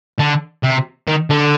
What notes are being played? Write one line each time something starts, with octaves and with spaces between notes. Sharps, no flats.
D3
C3
D#3
D3